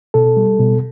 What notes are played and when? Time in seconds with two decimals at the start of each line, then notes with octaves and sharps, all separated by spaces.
0.14 B2 A4
0.37 G3
0.60 B2